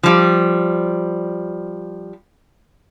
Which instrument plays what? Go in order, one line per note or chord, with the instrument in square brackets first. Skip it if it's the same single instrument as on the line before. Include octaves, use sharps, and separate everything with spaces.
[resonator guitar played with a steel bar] F3 G3